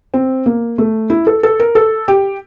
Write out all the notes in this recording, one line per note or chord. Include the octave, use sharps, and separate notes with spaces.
C4
A#3
A3
E4
A4
A4
A#4
A4
G4